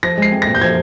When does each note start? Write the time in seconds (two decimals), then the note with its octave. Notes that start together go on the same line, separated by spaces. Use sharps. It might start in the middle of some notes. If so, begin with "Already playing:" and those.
0.03 F3 A#6
0.18 G#3 C7
0.32 C4
0.42 A#2 A#6
0.55 G6
0.61 F3 G#6